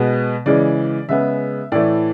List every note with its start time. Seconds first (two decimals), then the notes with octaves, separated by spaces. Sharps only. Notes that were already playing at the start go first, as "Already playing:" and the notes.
Already playing: B2 G#3 B3
0.46 C#3 E3 G#3 D5
1.09 C#3 G#3 B3 E5
1.72 A2 E3 A3 D5